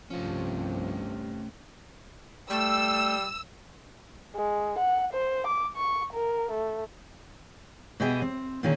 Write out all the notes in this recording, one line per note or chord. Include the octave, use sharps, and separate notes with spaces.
C2 G2 C3 F3 A3 C#4
G3 A3 E6
G#3
F#5
C5
D6
C#6
A#4
A3
B2 B3 G4 G#4 D#5 E5
C4
A#2 D3 D#3 A#3 C#4 G#4